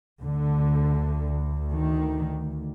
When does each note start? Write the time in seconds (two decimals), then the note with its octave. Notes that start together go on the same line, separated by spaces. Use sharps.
0.21 D2 D3
1.72 D#3